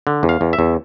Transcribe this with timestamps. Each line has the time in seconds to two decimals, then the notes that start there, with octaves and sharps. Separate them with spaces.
0.07 D3
0.23 E2
0.29 F5
0.41 E2
0.53 E5
0.59 E2